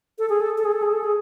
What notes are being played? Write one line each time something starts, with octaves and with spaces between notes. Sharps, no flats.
A4
G#4
A4
A4
G#4
A4
G#4
A4
G#4